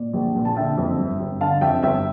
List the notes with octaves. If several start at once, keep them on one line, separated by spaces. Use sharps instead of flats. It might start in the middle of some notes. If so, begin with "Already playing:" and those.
Already playing: A#2 D5
A#1
A#2
A5
D3 E5 G5
F2
G1
G1
D3 F5 A5
F2 E5 G5
G1 E5 G5